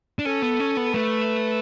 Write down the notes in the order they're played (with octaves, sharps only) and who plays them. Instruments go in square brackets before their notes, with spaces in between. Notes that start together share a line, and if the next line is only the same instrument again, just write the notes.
[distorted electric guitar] D4
[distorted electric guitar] C#4 [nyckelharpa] A4
[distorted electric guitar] B3
C#4
B3
[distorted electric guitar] A3 [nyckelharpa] B4